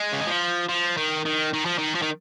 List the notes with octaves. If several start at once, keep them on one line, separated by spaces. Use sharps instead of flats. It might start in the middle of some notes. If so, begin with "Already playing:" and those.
Already playing: G#3
C#3
D#3
F3
F3
D#3
D#3
D#3
F3
D#3
F3
D#3